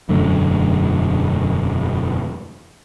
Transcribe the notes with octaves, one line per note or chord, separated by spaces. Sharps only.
E1 F#2 D3 A3